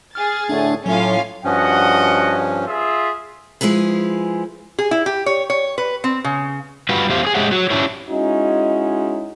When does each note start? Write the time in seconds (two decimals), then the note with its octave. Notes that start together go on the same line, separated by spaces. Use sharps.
0.15 G#4 F6 A6
0.49 A2 D3 A3 D4
0.86 A2 F#3 C#4 F4 F5
1.45 G2 F3 C#4 F#4 D#5 F#5
2.66 F4 G#4 E5
3.61 F3 G#3 E4 G#4 B4
4.79 G#4
4.91 E4
5.06 G4
5.26 C#5
5.50 C#5
5.78 B4
6.04 C4
6.24 C#3
6.89 G3 F4 F#4 B4
7.10 E2 A3 G4 C5 F5
7.23 C4 G#4
7.35 G#3 G4 G#4 C#5 E5 F#5
7.51 F#3 F#4 C#5
7.70 C#4 D4 E4 G4 C#5
8.10 G#3 C#4 D#4 E4 F#4